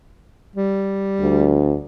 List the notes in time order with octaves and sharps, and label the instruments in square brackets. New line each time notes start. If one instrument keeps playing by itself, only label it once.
[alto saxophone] G3
[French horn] D2